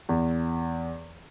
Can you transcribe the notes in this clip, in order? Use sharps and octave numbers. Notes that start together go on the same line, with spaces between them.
E2